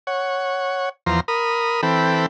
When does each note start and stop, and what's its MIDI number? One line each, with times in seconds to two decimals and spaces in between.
0.07 0.89 73
0.07 0.89 78
1.06 1.20 40
1.06 1.20 53
1.06 1.20 82
1.06 1.20 84
1.28 1.81 70
1.28 1.81 83
1.28 1.81 87
1.83 2.26 52
1.83 2.26 60
1.83 2.26 69
1.83 2.26 79
1.83 2.26 83